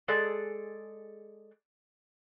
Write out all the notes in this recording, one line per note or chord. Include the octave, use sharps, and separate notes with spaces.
G#3 G#4 A4 D5